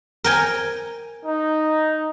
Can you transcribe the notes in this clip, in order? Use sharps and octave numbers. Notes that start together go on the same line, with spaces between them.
A#4 G5 G#5
D#4